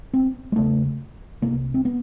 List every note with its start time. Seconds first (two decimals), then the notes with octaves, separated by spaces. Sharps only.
0.13 C4
0.52 G#3
0.56 E2 C#3 A3
1.42 C2 C3 A#3
1.74 C4
1.85 B3